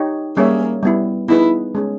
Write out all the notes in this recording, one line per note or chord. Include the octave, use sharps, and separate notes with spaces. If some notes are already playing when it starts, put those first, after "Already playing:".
Already playing: D#4 G4 C#5
G3 A#3 C#4 G#4 C#5 E5
G3 B3 E4
B3 D#4 E4 G#4 B4
G#3 C#4 G#4